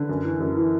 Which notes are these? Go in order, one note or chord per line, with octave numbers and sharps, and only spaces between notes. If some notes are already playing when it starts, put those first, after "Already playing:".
Already playing: D3 B4
F#2
E3
F#2
E3